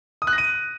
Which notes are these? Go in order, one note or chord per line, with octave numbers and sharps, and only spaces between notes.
D#6
F#6
A#6
D#7